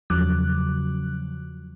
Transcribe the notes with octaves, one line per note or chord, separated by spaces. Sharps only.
E2 C#3 F3 F#3 D6 F#6